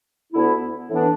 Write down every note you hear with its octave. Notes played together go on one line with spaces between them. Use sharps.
D2 D3 B3 E4
A2 E3 B3 D4